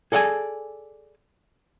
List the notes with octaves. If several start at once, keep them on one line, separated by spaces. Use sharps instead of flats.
G#4 A4 D5 F#5 G#5